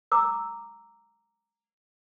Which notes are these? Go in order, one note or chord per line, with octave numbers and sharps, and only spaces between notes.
A#5 D6 E6